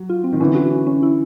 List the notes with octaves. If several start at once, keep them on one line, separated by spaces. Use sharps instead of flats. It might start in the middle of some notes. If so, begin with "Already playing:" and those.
Already playing: F#3
F4
C4
D#3
D3 E3 C#4
F#4
C#4
C#4
E4